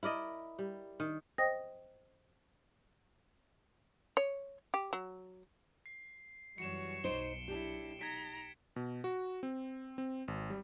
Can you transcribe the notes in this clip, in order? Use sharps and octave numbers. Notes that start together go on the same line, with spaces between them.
E4 A#4 D5 D#5
G3
D#3
C5 D#5 G5 D#6 A#6
C#5
G4
F#3
C7
F#2 E3 G3 F#4 C#5 C#7 E7
B1 D#4 C5 D7 G7
D4 E4 G4
D#4 A#5 G#6 B6 D7
B2
F#4
C4
C4
G#1
G3